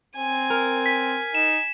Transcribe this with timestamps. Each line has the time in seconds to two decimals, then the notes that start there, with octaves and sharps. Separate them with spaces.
0.17 C4 G#5
0.50 A#4
0.86 B6
1.35 D#4 E7